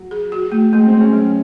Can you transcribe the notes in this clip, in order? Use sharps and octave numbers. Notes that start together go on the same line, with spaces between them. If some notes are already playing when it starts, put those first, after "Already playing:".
Already playing: F#3
G#4
F#4
A3
G#3 A3
C4
A3
C#4
F#3